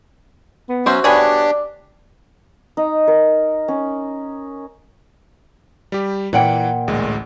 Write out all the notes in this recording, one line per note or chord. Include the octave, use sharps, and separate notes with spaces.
B3
F#3 C#4 F#4 C5 E5
B3 D4 G4 G#4 C#5 D5
D#4
A#4
C#4
G3 G4
A#2 E3 F#5 G5
A1 D2 G#3